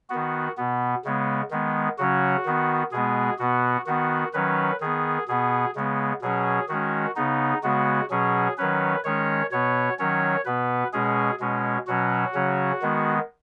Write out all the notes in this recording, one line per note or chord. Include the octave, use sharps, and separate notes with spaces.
D#3 B3 F#4
B2 B3
C#3 G#3 B3
D#3 G#3 B3
C#3 F#3 C#4 F#4
D#3 B3
B2 G#3 B3 G#4
B2 B3 F#4
D#3 B3 F#4
D#3 F#3 C#4 B4
D#3 B3 G#4
B2 B3 G#4
C#3 G#3 B3
B2 F#3 C#4 G#4
D#3 G#3 C#4 F#4
C#3 B3 D#4
C#3 G#3 B3 F#4
B2 F#3 C#4 G#4
D#3 F#3 C#4 B4
D#3 G#3 C#4 C#5
B2 B3 C#5
D#3 F#3 C#4 C#5
B2 B3 B4
B2 G#3 C#4 G#4
B2 G#3 C#4
B2 F#3 C#4 F#4
C#3 F#3 C#4
D#3 G#3 B3